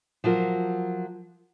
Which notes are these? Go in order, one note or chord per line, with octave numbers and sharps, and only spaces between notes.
F3 F#3 F4 A#4